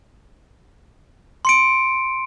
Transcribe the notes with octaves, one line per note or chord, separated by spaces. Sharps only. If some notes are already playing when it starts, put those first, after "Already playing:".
C6 C#7 D7